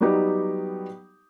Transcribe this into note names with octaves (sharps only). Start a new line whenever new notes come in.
F#3 G3 B3 D#4 G4